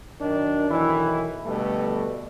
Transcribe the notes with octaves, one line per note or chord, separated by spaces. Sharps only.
F#2 D#3 D4
B1 D#3 E3 E4
B2 D3 G3 A3